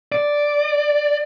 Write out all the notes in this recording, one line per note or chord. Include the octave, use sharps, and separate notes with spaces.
D5